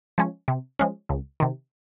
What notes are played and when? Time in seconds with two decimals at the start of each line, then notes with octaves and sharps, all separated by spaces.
0.18 F3 G#3 C#4
0.48 C3
0.79 F3 G#3 C#4
1.09 C#2
1.40 C3 D#3